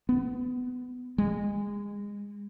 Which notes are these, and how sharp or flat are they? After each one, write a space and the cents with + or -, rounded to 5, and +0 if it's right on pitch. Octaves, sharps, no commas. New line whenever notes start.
B3 +20
G#3 -25